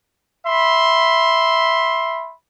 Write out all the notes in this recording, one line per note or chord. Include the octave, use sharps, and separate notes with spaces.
E5 B5 C6